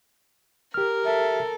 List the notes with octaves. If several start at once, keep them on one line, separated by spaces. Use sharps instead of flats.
G4 A#4 F6
A4 E5